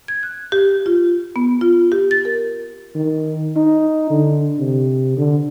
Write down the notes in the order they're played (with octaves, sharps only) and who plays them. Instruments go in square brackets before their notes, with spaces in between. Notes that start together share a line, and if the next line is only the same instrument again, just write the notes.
[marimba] G#6
F#6
G4
F4
B3
F4
G4
A6
A#4
[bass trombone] D#3
D#4
D3
C3
D3